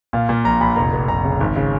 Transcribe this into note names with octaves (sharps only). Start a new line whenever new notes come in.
A#2 F5
A#2
A#1 A#5
A#1 B5
F1 A#5
F1
F1 A#5
C#3
G#1
C#3